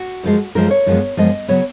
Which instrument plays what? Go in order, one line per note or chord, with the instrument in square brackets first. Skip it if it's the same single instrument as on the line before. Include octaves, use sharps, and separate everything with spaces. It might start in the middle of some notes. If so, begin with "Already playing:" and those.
Already playing: [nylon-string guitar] F#4
F#2 F3 G#3
F#2 F3 G#3 A#4
C#5
F#2 F3 G#3 B3
F#2 F3 G#3 B3 D#5
C#3 F#3 B3 C#5